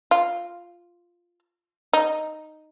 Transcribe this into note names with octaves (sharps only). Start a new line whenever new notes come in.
F4
D#4